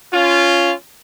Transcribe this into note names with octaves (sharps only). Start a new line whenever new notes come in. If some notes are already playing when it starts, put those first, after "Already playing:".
C#4 F4